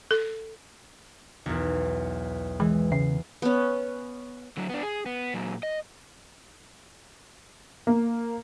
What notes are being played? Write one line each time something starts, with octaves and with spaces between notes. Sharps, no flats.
A4
B1 E2
E3 G#3
C#3 C7
B3 C#4
D3 F#3
B3 D4
G#4
B3
A#2 F#3
D#5
A#3